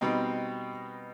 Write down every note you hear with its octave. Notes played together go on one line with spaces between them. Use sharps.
B2 G3 C4 D#4